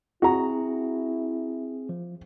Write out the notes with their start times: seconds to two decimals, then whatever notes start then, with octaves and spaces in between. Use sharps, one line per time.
0.22 C4 E4 F#4 G#4 A#5
1.89 F3